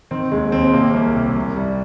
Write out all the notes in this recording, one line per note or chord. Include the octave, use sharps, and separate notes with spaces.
D#3 C4
D#2 G#3
D#2 C4
C3 A#3
C2
C3
C2
G3